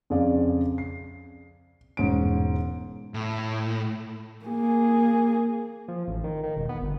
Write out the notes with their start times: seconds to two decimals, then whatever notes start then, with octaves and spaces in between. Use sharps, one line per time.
0.10 F2 C#3 G#4 D5 F5
0.78 C7
1.97 E1 G#2 C#4 D7
3.14 A2
4.45 A#3 G#4
5.88 F3
6.07 A1
6.24 D#3
6.44 D#3
6.57 E1
6.69 B3
6.82 G1